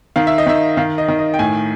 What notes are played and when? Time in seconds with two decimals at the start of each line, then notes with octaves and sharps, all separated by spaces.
0.16 D#3 F5
0.27 E5
0.38 D#5
0.46 D#3 E5
0.77 D#3 F5
0.98 D#5
1.08 D#3
1.19 D#5
1.34 G5
1.39 A2 G#5